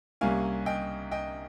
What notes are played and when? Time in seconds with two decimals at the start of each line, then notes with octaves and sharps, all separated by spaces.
0.21 C2 C3 G3 A#3 C#4 F5 G#5
0.66 D#5 G5
1.11 D#5 G5